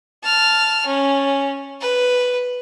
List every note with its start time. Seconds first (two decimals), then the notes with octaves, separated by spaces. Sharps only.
0.24 A5 F6
0.87 C#4
1.81 B4